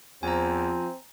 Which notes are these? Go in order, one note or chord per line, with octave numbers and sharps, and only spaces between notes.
E2 F3 C4 G#5 A#5